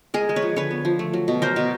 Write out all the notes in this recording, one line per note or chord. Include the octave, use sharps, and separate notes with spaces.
G#3 G#4 A#4
G#3
B4 C#5
F3
D3 B4 C#5
B3
F3
A3
F#3
B2
F#3 A#4 C5
B2